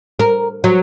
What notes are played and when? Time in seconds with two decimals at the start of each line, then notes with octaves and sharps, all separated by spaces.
0.19 A#4
0.64 F#3